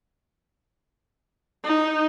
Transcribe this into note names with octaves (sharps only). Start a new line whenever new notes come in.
D#4